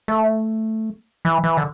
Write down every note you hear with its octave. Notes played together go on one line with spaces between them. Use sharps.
A3
E3
E3
D3